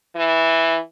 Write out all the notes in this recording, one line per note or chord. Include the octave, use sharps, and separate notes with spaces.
E3